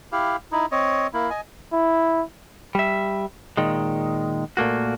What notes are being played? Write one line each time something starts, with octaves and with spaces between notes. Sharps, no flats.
E4 G4 F5
D#4 E4
C4 C#5 D#5
A#3 E4
D#5 G#5
E4
G3 E5
A#2 D#3 G#3
A#2 A3 A#3 F#4